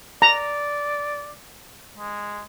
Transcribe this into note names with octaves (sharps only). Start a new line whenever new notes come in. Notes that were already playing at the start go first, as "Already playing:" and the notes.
D5 A#5
G#3